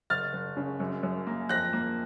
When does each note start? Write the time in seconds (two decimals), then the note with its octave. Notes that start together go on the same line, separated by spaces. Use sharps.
0.10 F#1 F6 A6
0.33 F#1
0.57 C#3
0.80 F#2
1.03 F#2
1.27 A#3
1.49 F2 F#6 A#6
1.73 A#3